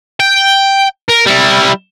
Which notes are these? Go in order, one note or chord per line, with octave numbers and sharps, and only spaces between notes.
G5
A#4
G3 E4